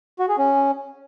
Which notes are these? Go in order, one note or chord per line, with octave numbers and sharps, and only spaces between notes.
F#4
G#4
C#4